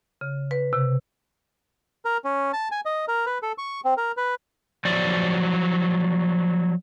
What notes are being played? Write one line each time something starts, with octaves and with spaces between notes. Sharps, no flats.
C#3
B4
C3
A#4
C#4
A5
G#5
D#5
A#4
B4
A4
C#6
C4
A#4
B4
F3 F#3 D5